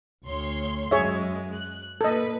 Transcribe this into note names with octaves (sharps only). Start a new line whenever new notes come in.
D2 C#5 C6
F#2 G#3 G#4 C#5 E5
F#6
A#2 A4 B4 D#5